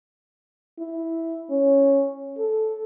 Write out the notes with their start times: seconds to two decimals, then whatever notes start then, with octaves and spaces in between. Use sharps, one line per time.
0.79 E4
1.50 C#4
2.39 A4